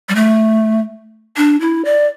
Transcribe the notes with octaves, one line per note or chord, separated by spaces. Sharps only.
G3
A3
D4
E4
D5